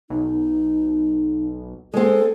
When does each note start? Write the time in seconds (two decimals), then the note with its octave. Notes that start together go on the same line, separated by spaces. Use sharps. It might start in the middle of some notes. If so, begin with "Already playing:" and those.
0.10 B1 D#4
1.94 G#3 C4 A4